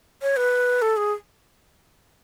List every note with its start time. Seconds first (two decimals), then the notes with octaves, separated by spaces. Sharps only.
0.22 C#5
0.37 B4
0.82 A4
0.97 G#4